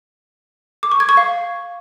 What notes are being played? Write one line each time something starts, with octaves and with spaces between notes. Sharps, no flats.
D6
C#6
G#6
C#6
F5